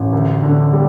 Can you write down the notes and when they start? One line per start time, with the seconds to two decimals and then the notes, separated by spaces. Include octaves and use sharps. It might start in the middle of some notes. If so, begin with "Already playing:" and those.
Already playing: A1
0.13 D2
0.43 D3
0.73 G3